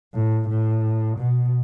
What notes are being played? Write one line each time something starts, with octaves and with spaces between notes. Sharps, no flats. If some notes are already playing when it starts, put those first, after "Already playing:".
A2
A2
B2